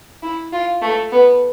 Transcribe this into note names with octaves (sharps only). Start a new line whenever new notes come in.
E4
F4
A3
B3